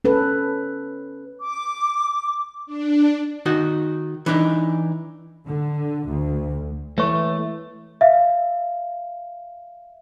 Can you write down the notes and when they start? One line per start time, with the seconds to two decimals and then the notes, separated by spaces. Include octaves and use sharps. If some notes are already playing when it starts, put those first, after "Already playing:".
0.05 C#4 A4 B4
1.42 D6
2.66 D4
3.46 D#3 D#4 F#4
4.26 E3 D4 D#4
5.47 D3
6.08 D2
6.98 E3 A3 B4 C#5 C#6
8.01 E5 F5